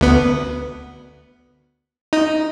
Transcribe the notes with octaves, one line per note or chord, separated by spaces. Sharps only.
D2 B3
D#4